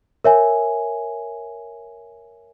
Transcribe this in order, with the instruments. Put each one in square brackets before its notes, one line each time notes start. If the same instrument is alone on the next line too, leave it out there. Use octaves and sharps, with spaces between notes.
[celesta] A#4 C#5 E5 G#5